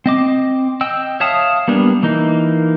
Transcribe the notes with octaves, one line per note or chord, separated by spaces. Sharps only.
C4 D#5 D6
D#5 G5 E6
C#5 E5 F5 A5 D#6
G3 A#3 B3 D4
E3 A#3 D#4